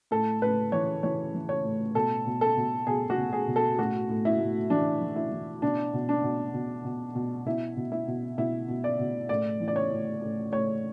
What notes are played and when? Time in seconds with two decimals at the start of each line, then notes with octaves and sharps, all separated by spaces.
0.11 A2 A4
0.42 A2 B4
0.72 E3 C#5
1.03 E3 C#5
1.34 E3
1.49 C#5
1.64 A2
1.95 B2 A4
2.26 B2
2.41 A4
2.57 B2
2.87 B2 G#4
3.10 F#4
3.17 B2
3.33 G#4
3.48 B2
3.56 A4
3.78 A2 F#4
4.09 A2
4.25 E4
4.40 A2
4.70 E3 D4
5.02 E3
5.16 E4
5.32 E3
5.62 B2 D4
5.94 B2
6.09 D4
6.23 B2
6.54 B2
6.85 B2
7.15 B2
7.45 B2 E4
7.77 B2
7.92 E4
8.07 B2
8.37 B2 E4
8.68 B2
8.84 D5
8.99 B2
9.29 A2 D5
9.60 E3
9.68 D5
9.76 C#5
9.91 A2
10.21 A2
10.52 A2 C#5